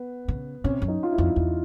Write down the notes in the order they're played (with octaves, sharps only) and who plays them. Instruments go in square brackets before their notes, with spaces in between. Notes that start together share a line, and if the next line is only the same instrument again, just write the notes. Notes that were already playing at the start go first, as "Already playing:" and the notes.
Already playing: [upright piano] B3
[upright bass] C#3
[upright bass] C3 [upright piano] C#4
[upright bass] F#2
[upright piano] D#4
F4
E4
[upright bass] F2
E2